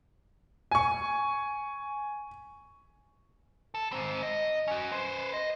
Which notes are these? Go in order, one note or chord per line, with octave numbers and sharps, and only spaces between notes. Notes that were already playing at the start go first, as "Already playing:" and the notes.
G#5 C#6
A4
G#2 C4
D#5
C#4 F#4
B4 C5
D#5